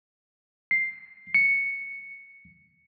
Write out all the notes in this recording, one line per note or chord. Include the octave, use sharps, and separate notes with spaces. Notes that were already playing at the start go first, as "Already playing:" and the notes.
C7
C#7